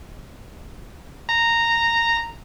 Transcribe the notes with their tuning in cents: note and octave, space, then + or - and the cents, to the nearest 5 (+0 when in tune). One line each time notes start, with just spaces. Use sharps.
A#5 -10